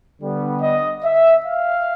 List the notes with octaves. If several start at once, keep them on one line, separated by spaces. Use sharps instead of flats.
D3 G3 B3
D#5
E5
F5